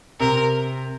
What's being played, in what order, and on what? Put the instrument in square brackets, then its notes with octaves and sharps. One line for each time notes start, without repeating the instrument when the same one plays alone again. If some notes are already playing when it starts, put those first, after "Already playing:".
[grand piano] C3 [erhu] A#4